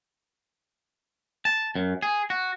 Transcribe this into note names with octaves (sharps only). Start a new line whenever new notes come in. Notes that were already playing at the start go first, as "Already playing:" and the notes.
A5
F#2
G#4
F#4